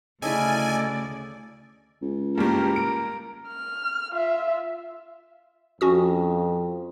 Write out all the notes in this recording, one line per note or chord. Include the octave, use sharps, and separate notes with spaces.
D2 C#3 E4 A4 D5 D#5 G#5
C#2
G2 G3 A#3 A#4
D7
F6
F4 E5
F2 C#4 F#4 D#6